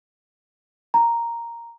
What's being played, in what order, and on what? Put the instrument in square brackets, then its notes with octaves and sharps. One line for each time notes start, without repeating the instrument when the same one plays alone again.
[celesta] A#5